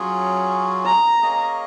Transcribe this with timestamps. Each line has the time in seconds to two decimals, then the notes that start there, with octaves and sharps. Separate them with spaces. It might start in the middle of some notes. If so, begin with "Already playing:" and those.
Already playing: F#3 C#4 F4 G#4
0.86 A#5
1.22 A#3 C#4 G#4 D#5